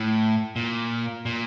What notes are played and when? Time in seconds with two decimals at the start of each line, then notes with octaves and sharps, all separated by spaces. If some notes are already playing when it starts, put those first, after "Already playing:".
Already playing: A2
0.56 A#2
1.26 A#2